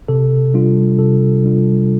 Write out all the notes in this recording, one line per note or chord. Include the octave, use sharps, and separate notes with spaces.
C3 A4
G3 D4 F4
C3 A4
G3 D4 F4